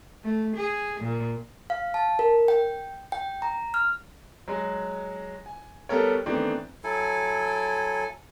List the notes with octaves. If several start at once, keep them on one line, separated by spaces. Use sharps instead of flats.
A3
G#4
A#2
F5
A5
A#4
G5
G5
A#5
F6
F#3 G#3
G#5
G3 B3 A4 A#4 C#5
D#3 E3 A3 B3 C4 D4
F#3 E4 A4 G#5